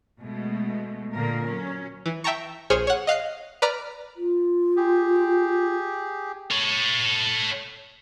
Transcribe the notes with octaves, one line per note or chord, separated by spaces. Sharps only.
B2 G#3 A3
A#2 D3 A#3 A#4
F#3 C#4
E3
E5 G5 A5 A#5 C#6
A#1 G#4 C5 C#5 F6 C#7
C#5 F#5
D#5 F5 F#6 C7
B4 D5 A#5 F6
F4
G4 G#4
A4 C#5